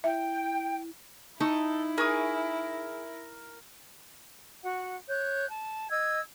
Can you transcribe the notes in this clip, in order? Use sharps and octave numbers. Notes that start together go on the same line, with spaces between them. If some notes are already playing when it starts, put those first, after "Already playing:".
E4 E5 G5
D#4 E4 A4 C#6
G#4 A#4 C#6 D#6
F#4 F#5
C#5 F#6 G6
A5
D#5 E6 G#6